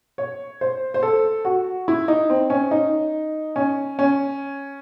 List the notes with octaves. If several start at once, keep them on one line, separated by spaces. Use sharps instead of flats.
C#5
C5
C5
A4
F#4
E4
D#4
C4
C#4
D#4
C#4
C#4